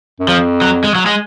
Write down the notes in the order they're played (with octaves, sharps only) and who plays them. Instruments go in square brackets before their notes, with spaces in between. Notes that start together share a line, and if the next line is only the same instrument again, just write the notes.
[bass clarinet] F#2
[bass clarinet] F2 [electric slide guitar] F3
[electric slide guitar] F#3
G#3
F#3
G#3